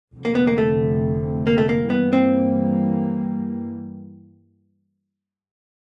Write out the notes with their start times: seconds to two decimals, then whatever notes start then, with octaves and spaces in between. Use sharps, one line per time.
0.13 F1 F2 D3
0.25 A#3
0.35 B3
0.47 A#3
0.58 A3
1.47 A#3
1.58 A3
1.69 A#3
1.90 G2 E3 G3 A#3 B3
2.13 C4